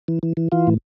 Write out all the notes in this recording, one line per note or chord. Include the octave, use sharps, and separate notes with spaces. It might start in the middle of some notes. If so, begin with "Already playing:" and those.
E3
E3
E3
E3 F4
A2